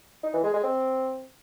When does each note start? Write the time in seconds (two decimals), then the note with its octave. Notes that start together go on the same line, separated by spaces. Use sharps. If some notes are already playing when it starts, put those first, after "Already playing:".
0.24 D#4
0.34 E3
0.44 G#3
0.54 G#3
0.64 C4